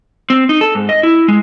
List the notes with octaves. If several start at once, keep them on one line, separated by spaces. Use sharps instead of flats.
C4
D#4
A4
G#2
D#5
E4
G#3